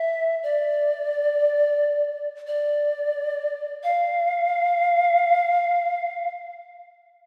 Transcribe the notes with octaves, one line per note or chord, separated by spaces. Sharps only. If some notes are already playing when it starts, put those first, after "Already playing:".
Already playing: E5
D5
D5
F5